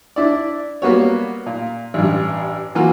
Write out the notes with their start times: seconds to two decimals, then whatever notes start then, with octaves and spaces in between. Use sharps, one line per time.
0.16 D4 E4 D5
0.82 G3 A#3 B3 F#4 C#5
1.46 A#2
1.94 A1 G2
2.75 E3 A#3 F4 F#4